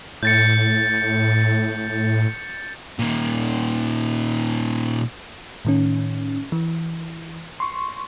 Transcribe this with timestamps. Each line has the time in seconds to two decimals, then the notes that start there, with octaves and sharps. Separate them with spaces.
0.23 A2 G6 A6 C#7
2.99 A#2 D#3
5.65 A2 D#3 C#4
6.52 E3
7.60 C6 C#6